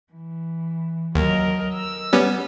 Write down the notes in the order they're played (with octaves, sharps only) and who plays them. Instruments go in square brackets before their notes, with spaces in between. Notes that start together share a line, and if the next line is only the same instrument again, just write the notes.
[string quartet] E3
[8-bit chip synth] D#2 [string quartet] F#3 A#4 D#5
[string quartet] E6
[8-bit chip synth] G3 B3 C#4